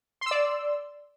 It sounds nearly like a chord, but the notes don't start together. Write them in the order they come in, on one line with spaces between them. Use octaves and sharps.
C6 E6 D5